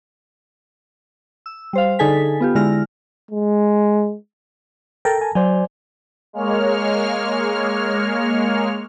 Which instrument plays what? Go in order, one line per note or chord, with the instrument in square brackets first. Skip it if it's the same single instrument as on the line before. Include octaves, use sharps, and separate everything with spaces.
[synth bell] E6
G3 C5 F5
D3 D#4 G#4 A4 G#5 B6
B3 F4 G4
D3 G#3 E4 F6 A#6
[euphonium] G#3
[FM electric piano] A4 A#4 [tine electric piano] G5
[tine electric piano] G#5 A5
[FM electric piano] F#3 [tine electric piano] C5 D5 G#5
[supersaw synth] G#3 A#3 C#5 F6